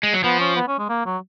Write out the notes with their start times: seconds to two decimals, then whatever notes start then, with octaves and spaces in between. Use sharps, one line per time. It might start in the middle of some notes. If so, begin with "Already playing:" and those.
0.03 G#3
0.14 F#3
0.24 F3 B3
0.40 C#4
0.56 B3
0.68 C#4
0.79 G#3
0.89 A#3
1.06 F#3